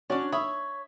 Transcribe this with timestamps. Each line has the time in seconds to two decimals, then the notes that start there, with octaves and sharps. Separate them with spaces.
0.10 C#4 D4 F#4 C#5 D5
0.32 C#5 E5 B5 D#6